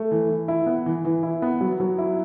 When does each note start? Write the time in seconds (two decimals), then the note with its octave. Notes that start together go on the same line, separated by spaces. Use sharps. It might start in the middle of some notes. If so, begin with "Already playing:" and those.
Already playing: A3
0.11 E3
0.29 E3
0.48 E4
0.66 B3
0.86 E3
1.05 E3
1.23 E4
1.42 B3
1.61 F#3
1.80 F#3
1.98 E4